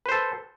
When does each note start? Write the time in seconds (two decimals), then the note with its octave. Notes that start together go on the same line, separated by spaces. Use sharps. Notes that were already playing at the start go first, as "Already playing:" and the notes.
0.06 B4
0.09 C5
0.12 A4